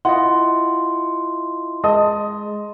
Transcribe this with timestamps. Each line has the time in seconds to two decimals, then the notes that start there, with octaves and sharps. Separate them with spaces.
0.05 E4 F4 D#5 F#5 C6
1.84 G#3 D#5 A5 D#6